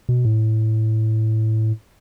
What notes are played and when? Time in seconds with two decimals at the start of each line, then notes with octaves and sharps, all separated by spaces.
0.09 B2
0.25 A2